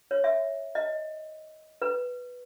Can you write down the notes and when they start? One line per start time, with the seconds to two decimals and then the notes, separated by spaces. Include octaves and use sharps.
0.11 C#5
0.24 E5
0.75 D#5
1.82 B4